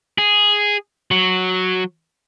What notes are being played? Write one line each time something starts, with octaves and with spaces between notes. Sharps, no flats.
G#4
F#3